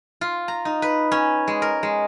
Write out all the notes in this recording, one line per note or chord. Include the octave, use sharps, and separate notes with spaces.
F4
A#5
D#4
B4
C#4
G#3
A#4
G#3